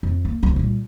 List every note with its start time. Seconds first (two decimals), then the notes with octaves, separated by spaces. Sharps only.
0.03 F2
0.25 A#3
0.43 D2 F#3
0.56 A#2 G3